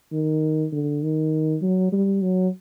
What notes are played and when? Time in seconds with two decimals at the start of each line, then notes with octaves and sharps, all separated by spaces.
0.12 D#3
0.72 D3
1.02 D#3
1.62 F#3
1.92 G3
2.22 F#3